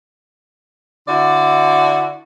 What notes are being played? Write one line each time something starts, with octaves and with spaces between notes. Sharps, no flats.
D3 E4 F#4 D5